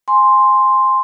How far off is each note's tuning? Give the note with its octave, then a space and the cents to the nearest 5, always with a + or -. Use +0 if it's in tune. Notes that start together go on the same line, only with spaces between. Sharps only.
G#5 +0 C6 +0